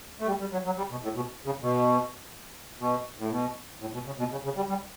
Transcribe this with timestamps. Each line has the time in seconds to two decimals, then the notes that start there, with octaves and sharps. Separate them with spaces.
0.21 A3
0.27 G3
0.40 G3
0.53 F#3
0.66 F#3
0.78 G3
0.91 B2
1.04 A2
1.16 B2
1.46 C#3
1.62 B2
2.80 B2
3.19 A2
3.31 B2
3.81 A2
3.94 B2
4.06 C#3
4.19 B2
4.31 C#3
4.44 C#3
4.57 G3
4.69 G3